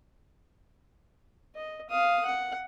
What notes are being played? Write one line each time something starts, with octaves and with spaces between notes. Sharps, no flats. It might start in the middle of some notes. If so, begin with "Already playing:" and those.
D#5
F5 D#6
F#5